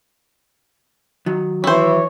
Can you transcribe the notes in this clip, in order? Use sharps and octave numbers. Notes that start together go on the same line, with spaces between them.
D#3 F#3
E3 E4 C5 C#5